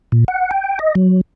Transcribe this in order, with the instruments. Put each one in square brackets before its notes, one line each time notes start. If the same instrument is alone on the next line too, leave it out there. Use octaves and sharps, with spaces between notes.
[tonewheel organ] A#2
F#5
G5
D#5
F#3